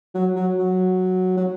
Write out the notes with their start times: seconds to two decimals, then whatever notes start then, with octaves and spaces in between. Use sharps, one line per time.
0.15 F#3
0.36 F#3
0.58 F#3
1.37 F#3